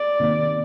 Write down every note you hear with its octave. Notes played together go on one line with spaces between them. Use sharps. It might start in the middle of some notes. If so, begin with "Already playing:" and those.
Already playing: D5
C3 D#3 A#3